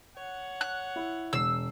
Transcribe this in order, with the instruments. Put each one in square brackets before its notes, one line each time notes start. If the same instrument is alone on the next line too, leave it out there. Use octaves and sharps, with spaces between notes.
[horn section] C#5 F#5
[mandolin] F#6
[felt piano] E4
[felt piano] E1 C7 [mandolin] E6